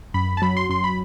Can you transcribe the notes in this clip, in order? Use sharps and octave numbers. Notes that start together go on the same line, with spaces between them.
F#2 B5
A5
F#3 B5
C6
F#2 C6
B5